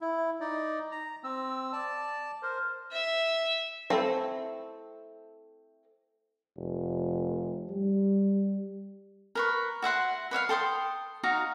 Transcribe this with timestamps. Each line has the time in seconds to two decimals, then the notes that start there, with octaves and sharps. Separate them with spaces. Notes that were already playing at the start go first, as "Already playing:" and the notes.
0.01 E4
0.41 D#4 D5
0.92 A#5
1.24 C4 E6
1.73 D5 A5
2.42 A#4 C5
2.92 E5
3.90 A3 C4 E4 A4 C5
6.57 F1
7.69 G3
9.35 A#4 B4 C#6
9.82 F#4 E5 F#5 C6
10.31 B4 C#5 E5 F5
10.49 A4 G5 C6 D#6
11.23 D#4 F#4 F5 A#5